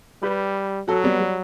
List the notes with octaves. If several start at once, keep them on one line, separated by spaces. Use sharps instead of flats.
G3 G4 B4
F#3 F#4 A4
G3 B3
G3